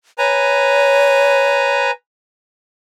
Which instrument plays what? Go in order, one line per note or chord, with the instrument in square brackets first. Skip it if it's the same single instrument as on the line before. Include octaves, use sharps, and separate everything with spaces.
[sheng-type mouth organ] B4 G#5 A#5 [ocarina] C#5